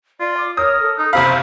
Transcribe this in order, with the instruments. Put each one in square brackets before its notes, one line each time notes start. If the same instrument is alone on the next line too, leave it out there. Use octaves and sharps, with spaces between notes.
[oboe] F4 [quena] D5
[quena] D6
[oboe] A#4 [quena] C#5 [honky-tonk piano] D#6
[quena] A4
[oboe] D#4
[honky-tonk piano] F#1 C3 F5 [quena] C5 [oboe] B5